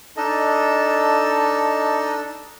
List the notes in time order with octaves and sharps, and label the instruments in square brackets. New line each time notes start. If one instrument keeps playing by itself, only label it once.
[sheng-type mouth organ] D4 A4 [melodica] D#4 D#5